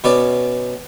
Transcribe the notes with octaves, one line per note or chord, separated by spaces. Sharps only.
B2 B3 C#4 B4 D5